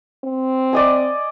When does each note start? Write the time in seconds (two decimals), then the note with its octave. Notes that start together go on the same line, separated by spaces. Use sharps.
0.24 C4
0.73 D5 D#5 G#5